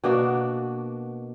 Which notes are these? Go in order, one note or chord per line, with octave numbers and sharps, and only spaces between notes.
B2 A#3 D4 F#4